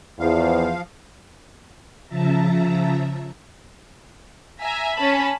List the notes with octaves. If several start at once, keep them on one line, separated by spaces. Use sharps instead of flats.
E2 F3 F5
C#3 F3 E5 A5 A#5
E5 G#5 A#5
C#4 A5 B5